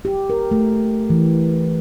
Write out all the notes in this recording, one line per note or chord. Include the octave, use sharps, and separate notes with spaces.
G4
A#4
A3
E3